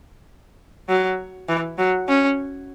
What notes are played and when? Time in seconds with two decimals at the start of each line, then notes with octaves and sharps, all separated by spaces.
0.89 F#3
1.49 E3
1.78 F#3
2.08 C#4